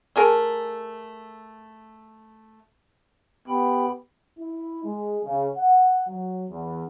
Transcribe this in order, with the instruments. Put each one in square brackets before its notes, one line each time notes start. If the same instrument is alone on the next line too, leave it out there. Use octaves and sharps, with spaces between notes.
[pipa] A3 G#4 A#4
[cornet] B3 [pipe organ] G4 G5 B5
[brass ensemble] E4
G#3
C#3
F#5
F#3
E2